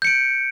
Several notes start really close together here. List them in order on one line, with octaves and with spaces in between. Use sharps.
G6 C#7 D7